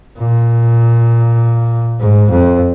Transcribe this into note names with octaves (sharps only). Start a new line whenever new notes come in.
A#2
G#2
F2